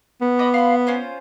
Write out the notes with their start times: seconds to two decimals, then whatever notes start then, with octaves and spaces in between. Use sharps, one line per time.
0.21 B3
0.39 D#5 B5 D6
0.54 F5 B5 C6
0.87 C#4 F4 C5